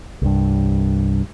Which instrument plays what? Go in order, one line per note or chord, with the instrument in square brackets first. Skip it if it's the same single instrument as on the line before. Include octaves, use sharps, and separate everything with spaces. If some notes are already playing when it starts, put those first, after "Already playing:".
[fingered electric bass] C2 G2